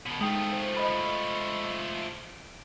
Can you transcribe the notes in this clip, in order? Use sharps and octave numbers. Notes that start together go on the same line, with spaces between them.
B2 D#3
F3 G#3 A3 D#4 G5 D#6
C5
D#5 B5
D7